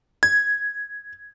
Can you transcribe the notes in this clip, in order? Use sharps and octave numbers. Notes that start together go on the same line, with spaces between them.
G#6